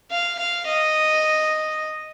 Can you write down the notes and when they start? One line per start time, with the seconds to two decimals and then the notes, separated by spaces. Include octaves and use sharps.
0.11 F5
0.39 F5
0.67 D#5